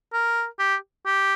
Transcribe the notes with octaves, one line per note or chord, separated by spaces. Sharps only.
A#4
G4
G4